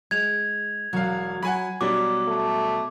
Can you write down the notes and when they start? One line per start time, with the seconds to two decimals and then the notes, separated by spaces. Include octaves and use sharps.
0.11 G#3 G#6 F7
0.93 E1 F#3 F5
1.43 F#3 F#5 G#5 B5
1.81 B2 F#3 G3 D4 D6
2.27 A3